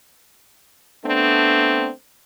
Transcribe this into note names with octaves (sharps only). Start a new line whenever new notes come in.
A3 B3 C4 D4